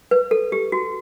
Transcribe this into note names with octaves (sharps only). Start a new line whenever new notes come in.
B4
A4
G4
F#4